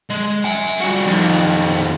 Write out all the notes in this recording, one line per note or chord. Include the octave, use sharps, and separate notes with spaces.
G#3
F#5 G#5
G3 F#4
F2 D#3